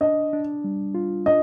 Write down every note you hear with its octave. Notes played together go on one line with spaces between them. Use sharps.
D4 D#5
D4
G3
F4
D4 D#5